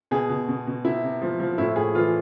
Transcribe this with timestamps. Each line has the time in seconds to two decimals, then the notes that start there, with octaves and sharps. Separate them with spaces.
0.11 B2 G#4
0.29 B2
0.48 B2
0.67 B2
0.85 C3 E4
1.03 C3
1.22 F3
1.40 F3
1.58 A2 E4
1.76 A2 G#4
1.95 E3 F4